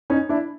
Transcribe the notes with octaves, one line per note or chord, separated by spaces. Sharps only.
C#4 D#4
D4 E4